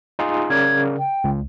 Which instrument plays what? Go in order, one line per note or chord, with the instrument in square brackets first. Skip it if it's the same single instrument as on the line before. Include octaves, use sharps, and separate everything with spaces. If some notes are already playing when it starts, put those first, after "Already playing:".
[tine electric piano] D#4 F4 G#4
[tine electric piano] C#3 A#4 D5 [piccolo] G#6
[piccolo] G5
[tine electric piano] C#2